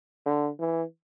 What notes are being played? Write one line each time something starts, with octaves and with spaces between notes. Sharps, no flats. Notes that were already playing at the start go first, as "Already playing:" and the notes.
D3
E3